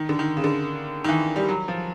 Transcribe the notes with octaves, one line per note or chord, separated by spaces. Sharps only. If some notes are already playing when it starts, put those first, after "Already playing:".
Already playing: D#3
D3
D#3
C#3
D3
D#3
E3
G3
F#3
F3